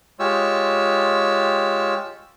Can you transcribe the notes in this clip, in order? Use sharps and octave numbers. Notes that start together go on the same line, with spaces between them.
G#3 F4 G4 C#5 E6